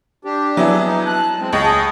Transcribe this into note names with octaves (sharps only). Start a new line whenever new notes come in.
D4 G4
F#3 B3 E4 G#4
D#4
A5 F#6
G#3 C4
C#2 G#4 D#5 C#6